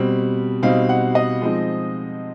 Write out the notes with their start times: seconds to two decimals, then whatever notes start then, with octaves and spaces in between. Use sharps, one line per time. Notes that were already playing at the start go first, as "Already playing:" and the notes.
Already playing: B2 G3 C4
0.63 B2 G3 C4 D#4 F5
0.89 F#5
1.15 D#5
1.42 F3 G#3 C4 D#4